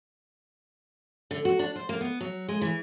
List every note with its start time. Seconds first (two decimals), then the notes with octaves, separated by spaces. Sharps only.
1.31 D3
1.45 F#4
1.59 D4
1.75 C5
1.89 A#3
2.01 B3
2.21 F#3
2.48 G#3
2.62 E3